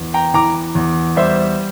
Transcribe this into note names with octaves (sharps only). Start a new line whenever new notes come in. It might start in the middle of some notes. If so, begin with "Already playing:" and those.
Already playing: E2
G5 A#5
E3 A#5 D6
E2
G3 C5 E5